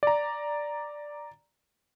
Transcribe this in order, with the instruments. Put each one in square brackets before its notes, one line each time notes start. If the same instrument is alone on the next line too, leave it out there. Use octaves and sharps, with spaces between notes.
[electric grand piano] D5 A#5